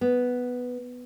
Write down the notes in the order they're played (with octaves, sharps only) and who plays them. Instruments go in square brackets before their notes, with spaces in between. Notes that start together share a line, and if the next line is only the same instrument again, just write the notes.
[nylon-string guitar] B3